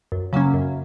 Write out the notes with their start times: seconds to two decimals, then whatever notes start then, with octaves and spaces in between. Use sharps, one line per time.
0.12 F#2
0.33 C#3 F#3 A#3 C#4
0.54 F#2